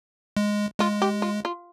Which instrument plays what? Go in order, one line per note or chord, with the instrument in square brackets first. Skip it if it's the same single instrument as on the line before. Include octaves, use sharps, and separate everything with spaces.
[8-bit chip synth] G#3
[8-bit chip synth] G#3 [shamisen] F4
[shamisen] G4
F4
F4